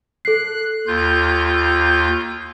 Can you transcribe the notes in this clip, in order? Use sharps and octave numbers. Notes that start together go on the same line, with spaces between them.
A4 F#6 C7
D#2 F4 G6